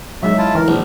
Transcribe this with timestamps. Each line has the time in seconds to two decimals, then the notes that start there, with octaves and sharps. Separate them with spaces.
0.23 F#3 G#3 D#4 E5
0.38 E4 F4 A5
0.55 E3 A#4
0.68 A#1 A#2 F3